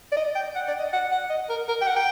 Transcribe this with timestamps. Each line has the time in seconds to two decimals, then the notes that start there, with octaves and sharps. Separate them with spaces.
0.12 D5
0.17 D#5
0.35 G5
0.55 F#5
0.68 D5
0.79 D#5
0.93 F#5
1.12 F#5
1.30 D#5
1.49 A#4
1.69 A#4
1.81 G5
1.87 F#5
1.96 G5